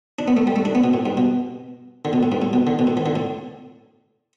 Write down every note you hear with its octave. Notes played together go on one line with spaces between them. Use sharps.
D4
B3
A3
G3
A3
D4
B3
B2
A2
G2
B2
D3
B2
A2
G2
A2
B2
D3
B2
A2
E3
D3
A2